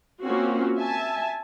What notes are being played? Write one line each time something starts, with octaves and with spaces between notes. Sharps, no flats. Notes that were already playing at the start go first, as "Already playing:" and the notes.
A#3 C4 C#4 F4 F#4
E5 G#5 A5